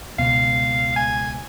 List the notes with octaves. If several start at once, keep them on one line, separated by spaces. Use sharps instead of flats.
C#2 B2 B3 F5
G#5